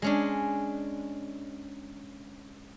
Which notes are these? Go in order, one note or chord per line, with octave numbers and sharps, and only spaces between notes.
G#3 C#4 D4